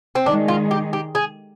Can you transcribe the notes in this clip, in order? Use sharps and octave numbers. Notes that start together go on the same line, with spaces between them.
C4
D#3 G#3 D4 D#4 G#4
F4
G4
G4
G#4